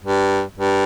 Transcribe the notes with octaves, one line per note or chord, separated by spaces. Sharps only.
G2
G2